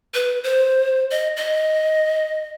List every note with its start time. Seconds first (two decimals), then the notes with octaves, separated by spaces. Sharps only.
0.14 B4
0.44 C5
1.11 D#5
1.36 D#5